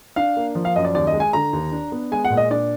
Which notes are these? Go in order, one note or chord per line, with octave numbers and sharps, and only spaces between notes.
D4 F5
A#3
F3
F5
F#2 D#5
D5
D#2 D5
D#5
G#3
G#5
D3 A#5
D#2
D4
B3
G#3 G#5
F#5
A#2
D#5
D4 D5